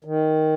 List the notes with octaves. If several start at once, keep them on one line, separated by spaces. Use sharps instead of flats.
D#3